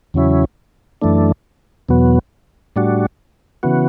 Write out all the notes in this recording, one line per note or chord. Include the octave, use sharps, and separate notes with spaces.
E2 C#3 F#3 C#4 E4
F#2 E3 A3 D4
E2 B2 F#3 B3
A2 G3 D4 F#4
C#3 E3 B3 F#4